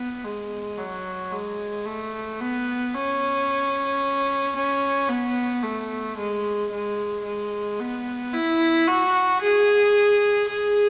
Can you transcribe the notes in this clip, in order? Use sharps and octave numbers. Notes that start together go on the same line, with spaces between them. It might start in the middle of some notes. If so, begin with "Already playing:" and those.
Already playing: B3
G#3
F#3
G#3
A3
B3
C#4
C#4
B3
A3
G#3
G#3
G#3
B3
E4
F#4
G#4
G#4